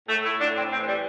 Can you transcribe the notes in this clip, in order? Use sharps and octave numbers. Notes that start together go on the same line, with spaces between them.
A2 A3
E4
A2 D4
C4
E3 C4
G3